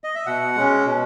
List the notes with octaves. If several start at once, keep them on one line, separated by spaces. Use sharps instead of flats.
D#5
E5
B2 F#5
G#3 C#4
B2